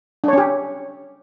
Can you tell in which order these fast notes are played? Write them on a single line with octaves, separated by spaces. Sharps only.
D4 C#5 C#4 G4